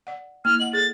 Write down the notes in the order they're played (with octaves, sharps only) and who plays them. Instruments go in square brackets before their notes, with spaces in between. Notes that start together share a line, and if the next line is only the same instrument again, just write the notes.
[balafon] D5 F#5
[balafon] A#3 E4 [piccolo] F6
[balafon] D#5 F#5 [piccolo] F#7
[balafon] G#4 A4 D5 [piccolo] A6